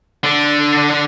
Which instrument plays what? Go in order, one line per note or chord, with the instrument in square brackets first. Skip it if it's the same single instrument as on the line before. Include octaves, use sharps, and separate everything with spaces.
[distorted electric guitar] D3 D4